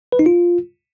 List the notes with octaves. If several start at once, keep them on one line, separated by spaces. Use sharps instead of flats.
B4
D#4
F4